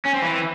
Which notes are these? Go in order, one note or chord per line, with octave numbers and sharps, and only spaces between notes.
C#4
C4
E3